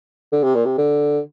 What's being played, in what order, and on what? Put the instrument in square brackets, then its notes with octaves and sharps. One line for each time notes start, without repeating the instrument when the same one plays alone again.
[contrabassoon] D3
C3
A#2
C3
D3